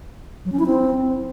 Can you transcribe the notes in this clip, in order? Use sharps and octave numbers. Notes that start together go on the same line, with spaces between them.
F#3
C#4
E4
C4